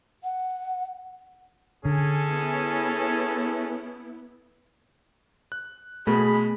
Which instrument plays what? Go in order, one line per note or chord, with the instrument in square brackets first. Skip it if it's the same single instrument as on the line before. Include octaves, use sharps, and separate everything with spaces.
[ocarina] F#5
[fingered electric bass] D3 [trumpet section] C#4 G#4 A4
[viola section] B3 E4
[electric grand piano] F#6
[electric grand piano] B2 [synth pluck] A3 [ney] G#4 [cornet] B5